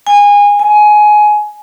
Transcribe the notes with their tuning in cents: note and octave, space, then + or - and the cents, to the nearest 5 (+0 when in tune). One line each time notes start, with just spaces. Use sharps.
G#5 -25
G#5 +15